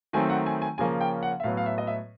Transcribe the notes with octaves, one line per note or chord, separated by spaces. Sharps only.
D#3 F#3 A3 C4 G#5
F#5
G#5
G#5
C#3 F3 A#3 C#4 G#5
G5
F#5
E5
A2 F#3 B3 F5
F5
E5
D#5
E5